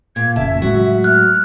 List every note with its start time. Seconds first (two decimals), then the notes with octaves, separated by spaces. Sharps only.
0.16 A#2 G#6
0.36 F1 C#3 E5 A5
0.62 A2 F#3 G#3 F#4
1.04 F6 F#6